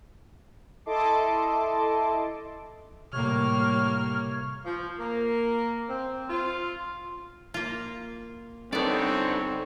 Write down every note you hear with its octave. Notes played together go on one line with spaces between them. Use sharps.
E4 A4 D#5 A5 C6 D6
A2 C3 G3 A#3 C#5 F6
F3
A#3
C4
F4
A#3 F4
G2 B3 C4 D4 D#4 A4 C#5 D5